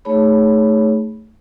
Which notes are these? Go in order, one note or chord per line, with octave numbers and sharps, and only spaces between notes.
A3 D#4 G#4 C#5 B5